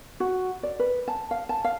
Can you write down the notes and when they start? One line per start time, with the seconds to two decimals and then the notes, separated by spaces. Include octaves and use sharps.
0.20 F#4
0.63 D5
0.79 B4
1.08 A5
1.31 F5
1.49 A5
1.64 F5